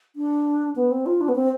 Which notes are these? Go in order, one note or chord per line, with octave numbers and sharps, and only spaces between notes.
D4
B3
C4
F4
D4
B3
C4